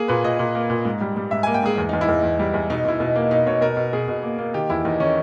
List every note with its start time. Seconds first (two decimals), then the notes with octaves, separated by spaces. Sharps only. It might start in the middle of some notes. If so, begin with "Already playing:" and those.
Already playing: A#3 G#4
0.08 A#2 B4
0.24 A#2 D#5
0.39 A#2
0.55 A#3
0.70 A#2
0.85 G#2
1.01 G3
1.16 G3
1.31 G#2 E5
1.43 A#3 G#5
1.54 G5
1.62 G#2 G#4
1.78 E2
1.89 E2 D#4
2.01 E4
2.09 E2
2.23 E2
2.39 G3
2.54 E2
2.70 B2 D#4
2.85 B2 E4
3.00 B2 D#4
3.15 A#3
3.31 B2 D#4
3.46 B2 C#5
3.61 B2 A#4
3.77 B2
3.93 B2 G#4
4.08 B2
4.23 A#3
4.39 A#3
4.54 D#3 G4
4.70 E2 E4
4.85 E2 D#4
5.00 D#3 C#4